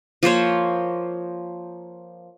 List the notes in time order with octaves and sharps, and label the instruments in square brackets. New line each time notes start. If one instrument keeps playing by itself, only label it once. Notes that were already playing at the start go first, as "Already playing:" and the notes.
[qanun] F3 A#3 C5 C#5